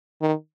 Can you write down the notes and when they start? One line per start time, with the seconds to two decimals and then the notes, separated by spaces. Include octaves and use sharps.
0.22 D#3